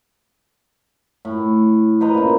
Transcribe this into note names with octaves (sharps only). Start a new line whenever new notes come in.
A2
B4 C5 D#5 A#5
A#2 C#3